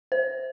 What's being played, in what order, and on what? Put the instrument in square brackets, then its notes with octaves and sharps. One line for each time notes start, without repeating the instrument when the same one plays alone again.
[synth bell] C5